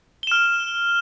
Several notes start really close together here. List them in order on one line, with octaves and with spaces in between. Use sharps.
G7 E7 F6